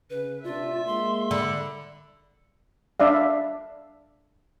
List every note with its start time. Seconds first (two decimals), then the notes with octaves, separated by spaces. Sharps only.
0.10 C#3 B4
0.44 A2 C3 D4 F4 E5
0.87 G#3 A#3 C6
1.31 D3 B5
3.00 D4 D5 E5 F5